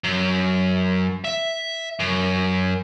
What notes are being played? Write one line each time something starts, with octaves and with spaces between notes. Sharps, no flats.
F#2
E5
F#2